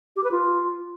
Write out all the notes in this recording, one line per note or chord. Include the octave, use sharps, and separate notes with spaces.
G4
B4
F4